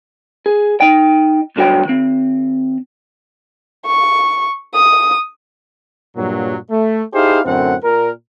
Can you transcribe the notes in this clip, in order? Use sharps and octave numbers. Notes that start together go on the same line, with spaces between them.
G#4
D#4 G5
B1 G2 D3 F#4 C#5 G5
D#3 C4
C#6
D#6
G2 A#2 F#3
A3
D#4 E4 G4 G#4 C5 F5
F#2 A2 D3 C4 F#5
A#2 A#4